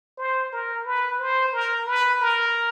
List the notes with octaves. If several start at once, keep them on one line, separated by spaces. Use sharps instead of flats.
C5
A#4
B4
C5
A#4
B4
A#4